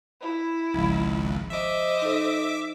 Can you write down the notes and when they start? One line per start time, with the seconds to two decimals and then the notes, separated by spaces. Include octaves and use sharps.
0.21 E4
0.74 G#1 C#2 F3
1.50 C5 D#5 E5 D6
2.02 D#4 A4